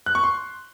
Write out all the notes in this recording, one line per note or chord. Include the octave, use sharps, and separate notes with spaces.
F#6
C#6
C6